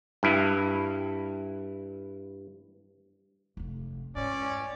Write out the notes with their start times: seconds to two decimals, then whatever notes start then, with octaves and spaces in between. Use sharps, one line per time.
0.23 G2 E4
3.57 F1 F2
4.16 G#2 C#4 D5